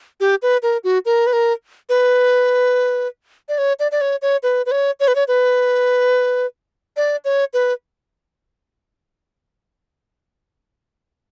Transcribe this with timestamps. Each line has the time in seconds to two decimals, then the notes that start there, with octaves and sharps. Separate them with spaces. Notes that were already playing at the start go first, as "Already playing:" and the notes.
0.20 G4
0.42 B4
0.63 A#4
0.84 F#4
1.06 A#4
1.27 B4
1.33 A#4
1.89 B4
3.49 D5
3.58 C#5
3.80 D5
3.92 D5
4.01 C#5
4.22 C#5
4.43 B4
4.66 B4
4.71 C#5
5.00 C#5
5.08 B4
5.15 C#5
5.28 B4
6.97 D5
7.25 C#5
7.54 B4